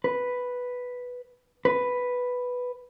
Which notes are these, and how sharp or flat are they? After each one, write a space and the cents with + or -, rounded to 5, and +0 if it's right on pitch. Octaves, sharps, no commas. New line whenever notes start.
B4 +0
B4 +0